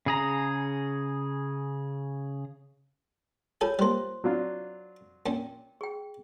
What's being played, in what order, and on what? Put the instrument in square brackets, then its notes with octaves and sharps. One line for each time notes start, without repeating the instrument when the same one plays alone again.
[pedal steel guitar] C#3 G#4 A#5
[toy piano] F4 C#5 [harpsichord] G#4 A4 G#5
[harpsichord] G3 A#3 [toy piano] C5 C6
[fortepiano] F#3 D4 F4
[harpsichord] A#2 C#4 [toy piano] G5
[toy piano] G#4 G5